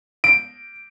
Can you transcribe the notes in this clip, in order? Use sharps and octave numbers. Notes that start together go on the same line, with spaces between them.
D7